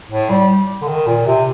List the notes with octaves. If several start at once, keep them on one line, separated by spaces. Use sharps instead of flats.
A2
G3
D3
D#3
A#2
C3